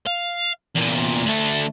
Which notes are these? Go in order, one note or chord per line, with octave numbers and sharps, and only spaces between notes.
F5
E2 A#2
D2 A3